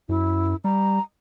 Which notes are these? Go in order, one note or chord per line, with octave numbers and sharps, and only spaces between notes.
F#2 E4
G3 A#5